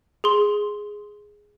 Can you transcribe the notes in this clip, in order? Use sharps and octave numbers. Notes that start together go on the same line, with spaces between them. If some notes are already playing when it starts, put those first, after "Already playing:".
G#4 C6